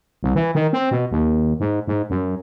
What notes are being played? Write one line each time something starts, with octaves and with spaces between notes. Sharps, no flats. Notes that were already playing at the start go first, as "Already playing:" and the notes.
C2
E3
D#3
C4
B2
D#2
G#2
G#2
F#2